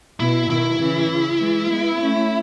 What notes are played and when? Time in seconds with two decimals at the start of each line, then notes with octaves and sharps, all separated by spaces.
0.20 B2 E4
0.50 B2 D#3 E4
0.80 C#3 E3
1.09 C#3
1.39 E3 G#3
1.69 G#3 B3
1.99 A3 C#4